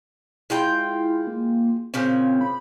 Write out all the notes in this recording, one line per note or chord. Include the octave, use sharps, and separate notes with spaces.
G#3 E4 F4 G5
A#3
A#2 C#3 F3 C4
B5